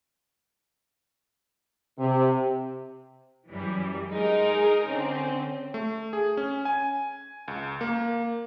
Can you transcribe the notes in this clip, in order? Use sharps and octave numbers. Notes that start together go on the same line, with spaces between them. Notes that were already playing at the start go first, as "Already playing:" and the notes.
C3
F#2 E3 G3
G#3 D#4 A#4
G#4
D3 C4 C#4
A3
G#4
C#4
G#5
C#2
A#3